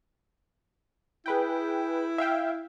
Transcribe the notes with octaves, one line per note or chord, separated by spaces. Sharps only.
E4 G#4 B4 G5
E5 F5 G5